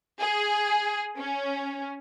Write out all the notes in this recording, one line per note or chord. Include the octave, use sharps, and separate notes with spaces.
G#4
C#4